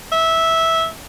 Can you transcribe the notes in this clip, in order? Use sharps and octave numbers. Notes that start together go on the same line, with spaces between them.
E5